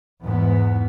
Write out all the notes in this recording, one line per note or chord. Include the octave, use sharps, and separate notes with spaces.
E2 G#2 B3